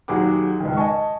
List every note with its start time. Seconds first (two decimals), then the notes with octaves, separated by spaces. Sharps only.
0.08 D#2 F#3 F#4 G#4 F#5 D6
0.60 C#2 G#2 D#3
0.77 D#5 G#5 A5 C#6